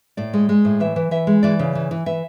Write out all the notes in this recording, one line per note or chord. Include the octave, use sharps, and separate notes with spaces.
A2 D5
G#3
G#3
A2
E3 E5
E3
E3 E5
G#3
E3 D5
C#3
E3
E3
E3 E5